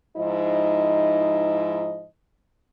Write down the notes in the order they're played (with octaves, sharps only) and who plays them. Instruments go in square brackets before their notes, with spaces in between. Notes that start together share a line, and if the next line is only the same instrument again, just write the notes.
[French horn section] G#2 F3 D#4 E4 D#5